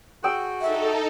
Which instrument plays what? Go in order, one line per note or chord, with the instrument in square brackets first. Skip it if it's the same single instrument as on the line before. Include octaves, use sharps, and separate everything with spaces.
[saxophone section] F#4 G#4 [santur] G5 E6
[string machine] D#4 A4 [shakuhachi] E5